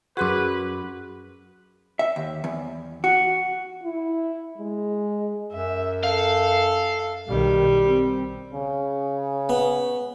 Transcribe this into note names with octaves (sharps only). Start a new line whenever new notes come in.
F#2 F#4 G#4 B4 C6 D6
E5
D#2
E2
F#4
E4
G#3
F#2 E5
A4 F5
B1 D#3 G3
C4
C#3
B3